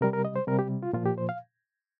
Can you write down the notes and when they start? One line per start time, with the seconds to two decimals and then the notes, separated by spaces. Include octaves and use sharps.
0.01 C3 G3 A#4
0.13 A#4
0.25 D#5
0.36 C5
0.47 C3 G3 A#4
0.59 G4
0.83 F4
0.93 A#2 F3 F4
1.05 G4
1.18 C5
1.29 F5